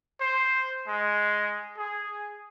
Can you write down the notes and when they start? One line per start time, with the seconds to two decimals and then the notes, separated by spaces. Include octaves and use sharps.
0.20 C5
0.87 G#3
1.78 G#4